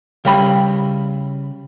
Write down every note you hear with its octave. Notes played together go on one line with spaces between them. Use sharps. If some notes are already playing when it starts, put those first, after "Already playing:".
C#3 G3 B5